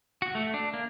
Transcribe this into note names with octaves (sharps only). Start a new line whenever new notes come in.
F#4
A3
D4
A#3